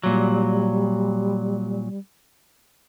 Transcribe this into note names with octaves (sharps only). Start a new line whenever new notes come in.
A#2 F#3 G3